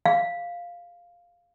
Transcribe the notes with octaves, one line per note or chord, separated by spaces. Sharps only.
F5